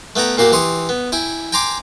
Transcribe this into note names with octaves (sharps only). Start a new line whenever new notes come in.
A3 B3 F#5 G5 A#5
A#2 A#3 F#4 G4
E3 G4 C6 C#6 D#6
B3
E4 G5 G#5
G5 G#5 A#5 C6 D6